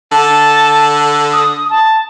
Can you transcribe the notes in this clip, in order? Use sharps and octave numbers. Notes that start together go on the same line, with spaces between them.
D3 A5
D#6
A5